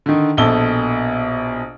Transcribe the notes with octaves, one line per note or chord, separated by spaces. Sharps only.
D3 D#3
A#1 B2 A4 G7